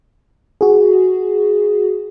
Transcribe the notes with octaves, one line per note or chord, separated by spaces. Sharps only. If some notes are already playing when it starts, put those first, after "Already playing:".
F#4 G#4